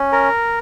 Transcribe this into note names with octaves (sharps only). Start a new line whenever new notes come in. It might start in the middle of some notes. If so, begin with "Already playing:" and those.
Already playing: C#4
A#4